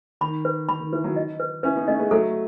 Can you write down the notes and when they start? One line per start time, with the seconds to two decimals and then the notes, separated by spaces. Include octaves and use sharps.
0.21 D#3 B5
0.45 B4
0.69 D#3 B5
0.80 D#3
0.93 E3 B4
1.04 D#3 F#3
1.16 D#5
1.40 B4
1.63 C#4 E4 B4
1.76 B3 D#4
1.88 A3 C#4 D#5
1.99 G#3 B3
2.11 F#3 A3 A4